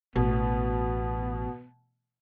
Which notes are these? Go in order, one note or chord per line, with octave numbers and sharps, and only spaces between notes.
A1 B2 B3